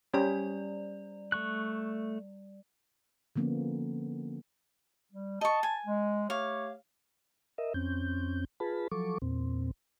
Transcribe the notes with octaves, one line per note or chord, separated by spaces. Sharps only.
G3 C#4 G4 D5 B5
A3 C#6 F#6
D3 F3 A#3 B3 C#4
G3
D#5 A5 C#6
G#5
G#3
A3 G4 C#5 F5
A#4 D#5 E5
F2 C4 C#4 G6
F4 G#4 B4 A5 B5
F3 F#3 A4 C#6 D6
E2 A#2 C4